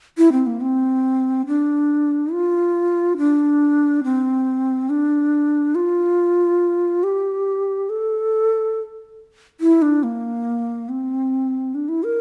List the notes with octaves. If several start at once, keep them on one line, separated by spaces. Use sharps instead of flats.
E4
C4
A#3
C4
D4
F4
D4
C4
D4
F4
G4
A4
E4
D4
A#3
C4
D4
E4
A#4